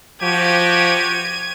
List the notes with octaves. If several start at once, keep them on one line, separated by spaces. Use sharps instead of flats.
F3 F#4 G4 G#6 D#7